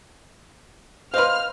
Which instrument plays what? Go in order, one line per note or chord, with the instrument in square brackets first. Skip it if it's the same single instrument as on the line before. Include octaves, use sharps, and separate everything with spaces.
[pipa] B4 F5 [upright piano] C5 D#5 C6 [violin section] F6